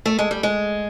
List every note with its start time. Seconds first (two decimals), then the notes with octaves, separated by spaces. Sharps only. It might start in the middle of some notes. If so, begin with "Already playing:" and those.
0.06 A3
0.19 G#3
0.31 G3
0.43 G#3